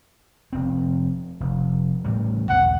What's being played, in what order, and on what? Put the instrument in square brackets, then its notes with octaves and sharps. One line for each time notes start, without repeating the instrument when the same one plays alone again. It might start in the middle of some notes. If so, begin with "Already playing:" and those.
[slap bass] F1 C4
F1
A2 E3 G3
[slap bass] B1 E2 [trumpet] F#5